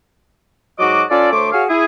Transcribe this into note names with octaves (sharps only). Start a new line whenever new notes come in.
G#2 F#3 F#4 D#5 D6
C#4 F4 A4 D5
D2 A3 C5 C#5 D6
F#4 G#4 C#5 F5
E4 G#4